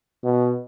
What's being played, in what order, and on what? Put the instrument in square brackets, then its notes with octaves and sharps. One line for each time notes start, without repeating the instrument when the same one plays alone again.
[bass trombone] B2